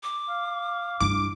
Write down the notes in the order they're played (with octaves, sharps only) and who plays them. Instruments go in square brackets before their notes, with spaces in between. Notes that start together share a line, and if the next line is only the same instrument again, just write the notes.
[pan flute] D6
[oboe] F5
[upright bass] G2 E4 [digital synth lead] D6